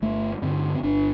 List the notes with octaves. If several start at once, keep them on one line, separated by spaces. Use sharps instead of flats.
G1 A3
G2 D3 C4
C4
G1 D4